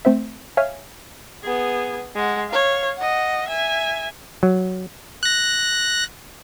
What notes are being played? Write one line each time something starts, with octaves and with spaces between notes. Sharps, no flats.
A3 C4 C5 E5
C#5 E5 F5 G#5 F6
B3 G#4
G#3 F#5
C#5 F5
D#5 F#5
E5 G#5
F#3
F#6 A#6